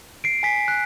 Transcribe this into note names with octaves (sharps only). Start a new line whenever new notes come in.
C7 D7
G#5 B6
F#6